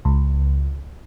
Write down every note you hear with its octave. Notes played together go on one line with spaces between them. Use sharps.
C#2